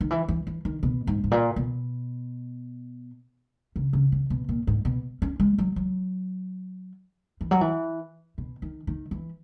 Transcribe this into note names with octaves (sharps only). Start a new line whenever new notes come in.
D#3
E3
E3
E3
D#3
B2
G#2
G#2
A#2
B2
C#3
C#3
C#3
B2
A#2
G#2
B2
C#4
G#3
F#3
F#3
E3
F#3
E3
B2
D#3
D#3
E3